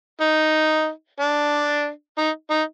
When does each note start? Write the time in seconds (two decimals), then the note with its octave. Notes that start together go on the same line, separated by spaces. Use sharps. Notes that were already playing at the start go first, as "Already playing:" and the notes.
0.21 D#4
1.20 D4
2.18 D#4
2.50 D#4